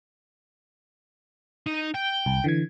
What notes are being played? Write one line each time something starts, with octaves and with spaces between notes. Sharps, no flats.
D#4
G5
C2
D3 E3 G#6